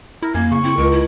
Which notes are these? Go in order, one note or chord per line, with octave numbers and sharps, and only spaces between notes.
E4 A#4
F#2 A#3 G#5
C#3 C#6
C4 E4
C#2 A#4
E4